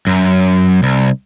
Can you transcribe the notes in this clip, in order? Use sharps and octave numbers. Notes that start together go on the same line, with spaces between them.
F#2
C2